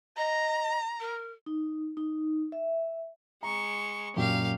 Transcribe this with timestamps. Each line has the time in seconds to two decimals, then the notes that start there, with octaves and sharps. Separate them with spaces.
0.17 D#5 A#5
1.00 A#4
1.46 D#4
1.97 D#4
2.52 E5
3.43 G#3 A#5 C#6
4.16 F#2 A#2 F#3 G4 F5